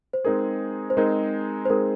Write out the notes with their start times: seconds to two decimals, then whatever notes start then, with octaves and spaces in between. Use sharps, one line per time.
0.13 C5
0.25 G#3 C4 D#4 G#4 A#4
0.90 C5
0.97 G#3 C4 D#4 G#4 A#4
1.65 C5
1.70 G#3 C4 D#4 G#4 A#4